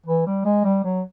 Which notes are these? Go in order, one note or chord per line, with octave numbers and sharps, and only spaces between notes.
E3
G3
G#3
G3
F#3